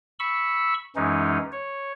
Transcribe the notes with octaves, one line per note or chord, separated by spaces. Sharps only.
B5 C#6 E6
F#2 E3 G#3 C#4 D#4
C#5